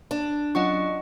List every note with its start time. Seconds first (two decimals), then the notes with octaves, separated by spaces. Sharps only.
0.11 D4
0.55 F#3 C#4 F4 D#5 F#5 C#6